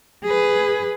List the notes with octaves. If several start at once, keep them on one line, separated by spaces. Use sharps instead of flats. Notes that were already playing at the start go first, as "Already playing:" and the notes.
G#4 B4